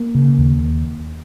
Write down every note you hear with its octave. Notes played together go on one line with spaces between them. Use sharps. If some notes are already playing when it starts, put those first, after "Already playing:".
Already playing: A#3
C#3
D#2